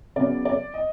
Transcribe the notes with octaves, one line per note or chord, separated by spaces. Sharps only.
C#3 F#3 B3 D5
D5
D#5